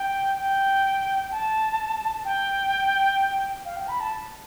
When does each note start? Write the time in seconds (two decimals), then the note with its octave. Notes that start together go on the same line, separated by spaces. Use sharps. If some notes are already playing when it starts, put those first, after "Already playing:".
Already playing: G5
0.38 G5
1.31 A5
2.25 G5
3.65 F5
3.77 G5
3.88 B5
4.00 A5